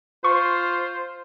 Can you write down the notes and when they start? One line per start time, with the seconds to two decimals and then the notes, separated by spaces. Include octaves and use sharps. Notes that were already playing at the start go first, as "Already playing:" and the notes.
0.24 F4 C5 C#6